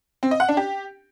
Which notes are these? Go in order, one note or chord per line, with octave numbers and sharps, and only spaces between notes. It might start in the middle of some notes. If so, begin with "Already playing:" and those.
C4
D#5
F#5
D4
G4